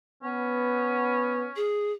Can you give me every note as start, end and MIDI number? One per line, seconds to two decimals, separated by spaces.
0.23 1.45 59
0.23 1.67 61
1.56 1.92 68